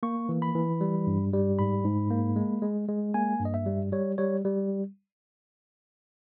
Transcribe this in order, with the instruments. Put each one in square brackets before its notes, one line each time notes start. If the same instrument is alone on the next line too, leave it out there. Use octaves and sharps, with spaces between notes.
[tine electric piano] A#3 C#6
E3
B5
E3
G3
G2
G3
G#2 B5
G#2
A#3
G#3
G#3
G#3
A#3 G#5
G2
D#5
E5
G3
G3 C#5
G3 C#5
G3